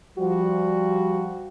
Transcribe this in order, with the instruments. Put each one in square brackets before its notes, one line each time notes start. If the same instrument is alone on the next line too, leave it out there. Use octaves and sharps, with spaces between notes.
[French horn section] F3 G3 F#4